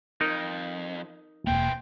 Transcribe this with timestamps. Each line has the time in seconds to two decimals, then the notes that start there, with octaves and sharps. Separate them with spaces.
0.21 F2 D#4 A#4
1.47 E1 E3 A#3 C4 G5